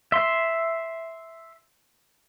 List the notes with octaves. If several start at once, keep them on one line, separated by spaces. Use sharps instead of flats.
E5 C6